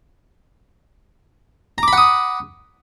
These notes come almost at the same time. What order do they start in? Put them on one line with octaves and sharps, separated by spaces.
A#5 D6 B5 F#5 D#6